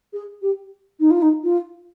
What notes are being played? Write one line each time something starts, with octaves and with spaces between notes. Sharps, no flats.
G#4
G4
D#4
F4
D#4
F4